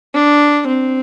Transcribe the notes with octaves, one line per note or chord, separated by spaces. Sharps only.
D4
C4